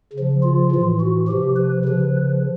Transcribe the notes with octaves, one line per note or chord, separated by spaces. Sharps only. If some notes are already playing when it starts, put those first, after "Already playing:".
C#3
F3
F4
A2 E3
F#4
C3 F3 G4
B4
C#3 F3